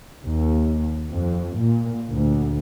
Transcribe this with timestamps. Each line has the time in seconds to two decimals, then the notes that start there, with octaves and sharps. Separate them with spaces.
0.24 D#2
1.11 F2
1.58 A#2
2.11 D2